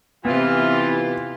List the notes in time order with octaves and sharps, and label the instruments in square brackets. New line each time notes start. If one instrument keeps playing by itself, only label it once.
[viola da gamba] C3 C4 G4 [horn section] E3 F4 [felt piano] B3